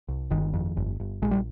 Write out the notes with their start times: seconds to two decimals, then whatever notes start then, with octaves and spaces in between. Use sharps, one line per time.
0.08 C2
0.30 G1 D#3
0.54 F2
0.77 G1
1.00 G1
1.22 A#1 G#3
1.31 G3